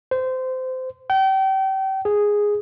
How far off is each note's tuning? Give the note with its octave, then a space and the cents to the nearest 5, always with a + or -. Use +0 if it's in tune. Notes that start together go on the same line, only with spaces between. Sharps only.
C5 -20
G5 -30
G#4 -5